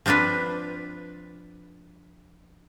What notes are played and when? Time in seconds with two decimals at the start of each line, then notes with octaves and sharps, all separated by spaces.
0.06 F3 C4 D4 F4 B4